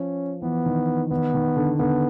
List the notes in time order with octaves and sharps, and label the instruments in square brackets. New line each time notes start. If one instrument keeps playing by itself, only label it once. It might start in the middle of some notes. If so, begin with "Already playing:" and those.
Already playing: [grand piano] F3 [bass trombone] C#4
[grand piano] E3 [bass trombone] B3
[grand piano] D#3
[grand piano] D#3 [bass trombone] B3
[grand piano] D#3
D3
[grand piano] D3 [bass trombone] B3